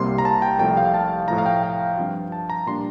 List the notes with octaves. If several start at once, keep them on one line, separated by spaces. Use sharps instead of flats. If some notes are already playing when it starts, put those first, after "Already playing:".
Already playing: C2 C3 G3 A#3 C6
A#5
A5
G5
C2 C3 F3 A3 G5
F5
A5
A2 F3 A3 E4 A#5
F5
G5
G5
G2 F3 C4 F4
A5
A#5
A#2 G3 D4 C6